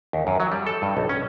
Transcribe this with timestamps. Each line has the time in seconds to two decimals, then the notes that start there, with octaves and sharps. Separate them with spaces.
0.13 D#2
0.27 F#2
0.40 F#3
0.52 G3
0.67 A4
0.82 G2
0.97 B1
1.09 C#4